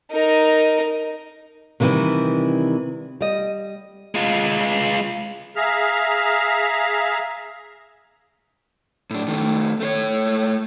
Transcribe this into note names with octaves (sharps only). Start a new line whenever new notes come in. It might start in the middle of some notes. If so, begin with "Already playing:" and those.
D#4 A#4
C3 D#3 E3 G3 C4
G3 D#5
G#3 F4
G#4 E5 F5 A#5 F6
A2 D4
D#3 A3
A3 C5 C#5